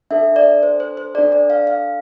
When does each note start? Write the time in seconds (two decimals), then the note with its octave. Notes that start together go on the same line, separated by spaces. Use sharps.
0.11 D4 A4 E5
0.36 D5
0.63 C5
0.80 C5
0.97 C5
1.15 D4 A4 D5
1.32 D5
1.50 F5
1.67 F5